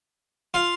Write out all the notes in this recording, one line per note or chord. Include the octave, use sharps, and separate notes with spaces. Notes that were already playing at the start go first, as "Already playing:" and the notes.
F4 F5